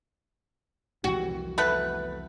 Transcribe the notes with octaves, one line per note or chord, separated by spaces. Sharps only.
C2 F2 E3 F#4
A3 B3 B4